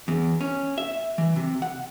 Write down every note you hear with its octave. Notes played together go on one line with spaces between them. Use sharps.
E2
C#4
E5
E3
C3
F#5